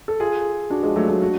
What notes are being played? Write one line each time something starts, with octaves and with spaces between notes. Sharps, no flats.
A4
F4 G#4
D4 F#4
F3 G#3
F#3 A3
F#3 A3
D4 F#4